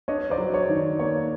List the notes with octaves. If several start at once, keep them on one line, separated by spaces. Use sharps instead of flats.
D4 C#5 D#5
C5 D5
F#3
C#5
D#3
A#3 C#5